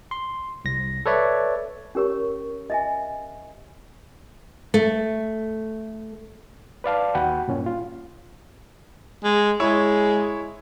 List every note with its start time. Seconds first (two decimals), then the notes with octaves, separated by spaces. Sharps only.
0.11 C6
0.65 C2 A#6
1.06 A4 B4 C#5 D5 E5
1.95 C#4 G4 A#4 C#5 C#6
2.70 D#5 E5 G#5
4.74 A3
6.84 B4 D5 F5 A5
7.15 D#2 F#4 F#5 G5 B5
7.48 G2 A#2 C#4
7.66 F4
9.23 G#3
9.60 G#3 E4 C#5